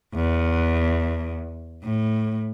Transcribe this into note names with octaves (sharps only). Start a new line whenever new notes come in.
E2
A2